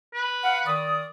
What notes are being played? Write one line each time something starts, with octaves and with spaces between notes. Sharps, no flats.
B4
F5 F#5
D#3 D5 D#6